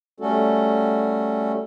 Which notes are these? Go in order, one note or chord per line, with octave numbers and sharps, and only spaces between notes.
G3 A3 C#4 F#4 A4